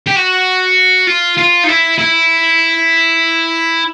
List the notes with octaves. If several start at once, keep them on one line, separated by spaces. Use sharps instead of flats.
G4
F#4
F4
F4
D#4
E4
E4